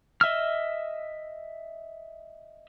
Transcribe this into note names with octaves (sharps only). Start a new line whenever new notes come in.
D#5 E5 E6 F6